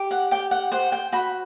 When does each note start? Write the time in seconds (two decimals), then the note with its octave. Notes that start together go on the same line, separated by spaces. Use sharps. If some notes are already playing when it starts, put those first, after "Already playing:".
Already playing: G4
0.11 F#5
0.31 G4 G5
0.51 F#5
0.72 C5 F#5
0.92 G5
1.12 F#4 B5